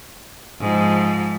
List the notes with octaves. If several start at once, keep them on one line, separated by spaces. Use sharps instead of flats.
G#2 F3